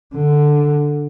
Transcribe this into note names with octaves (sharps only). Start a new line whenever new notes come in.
D3